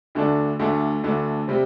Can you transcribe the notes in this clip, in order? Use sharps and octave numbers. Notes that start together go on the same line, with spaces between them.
D2 D3 A3 D4
D2 D3 A3 D4
D2 D3 A3 D4
C3 G3 C4